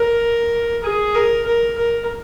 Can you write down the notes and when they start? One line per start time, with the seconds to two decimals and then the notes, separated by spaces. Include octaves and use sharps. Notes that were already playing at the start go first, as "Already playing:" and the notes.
Already playing: A#4
0.84 G#4
1.15 A#4
1.46 A#4
1.78 A#4